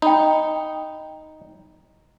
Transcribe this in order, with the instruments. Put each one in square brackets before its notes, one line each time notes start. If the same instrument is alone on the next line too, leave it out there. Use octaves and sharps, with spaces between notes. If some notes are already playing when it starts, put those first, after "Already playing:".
[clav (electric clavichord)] D#4 [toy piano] G5 B5